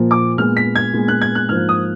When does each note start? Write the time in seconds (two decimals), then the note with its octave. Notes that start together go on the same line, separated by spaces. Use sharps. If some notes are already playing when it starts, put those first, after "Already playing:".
Already playing: A#2 F3 A#3
0.11 D6
0.38 A#2 G#3 B3 F6
0.57 B6
0.75 G#6
0.93 A#2 G#3 B3
1.08 F#6
1.21 G#6
1.35 F#6
1.49 G#2 F3 A#3 F6
1.69 D#6